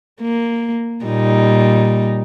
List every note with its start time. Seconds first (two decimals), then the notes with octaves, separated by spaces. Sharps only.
0.21 A#3
1.05 A#2 G3 D#4